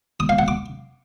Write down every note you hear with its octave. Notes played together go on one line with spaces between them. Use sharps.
D#6
F5
F#5
D6